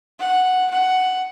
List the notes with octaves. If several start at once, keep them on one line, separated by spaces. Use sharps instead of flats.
F#5
F#5